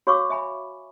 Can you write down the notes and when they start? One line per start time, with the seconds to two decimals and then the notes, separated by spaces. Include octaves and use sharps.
0.07 F#4 C#5 F5 C#6 D6 E6
0.30 E5 G#5 B5